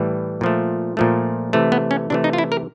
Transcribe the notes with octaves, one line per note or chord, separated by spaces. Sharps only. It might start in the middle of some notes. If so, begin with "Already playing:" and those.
Already playing: A2 E3 G3
A#2 F3 A3
A#2 F3 A3
C3 E3 A3
B3
C#4
C3 E3 A3 D4
D#4
F4
E4
A#4